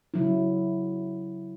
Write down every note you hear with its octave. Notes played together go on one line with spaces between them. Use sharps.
C#3 F#3 E4